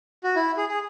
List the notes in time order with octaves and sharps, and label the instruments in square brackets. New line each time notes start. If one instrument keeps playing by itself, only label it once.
[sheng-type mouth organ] F#4
E4
G#4
G#4